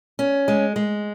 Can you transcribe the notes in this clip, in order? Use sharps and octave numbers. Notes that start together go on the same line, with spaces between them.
C#4
G#3
G#3